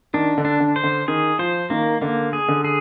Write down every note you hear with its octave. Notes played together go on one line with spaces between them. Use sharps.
D#3 D4
D3
D4
D3
C5
D3
D#3 G#4
F3 C5
D#3 A#3
D3 A#3
G#4
D3
G#4